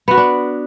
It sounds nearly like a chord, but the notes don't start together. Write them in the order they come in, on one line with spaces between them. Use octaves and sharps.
B3 F#4 B4 D4